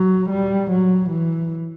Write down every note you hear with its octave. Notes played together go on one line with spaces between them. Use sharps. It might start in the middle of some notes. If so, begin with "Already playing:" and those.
Already playing: F#3
G3
F#3
E3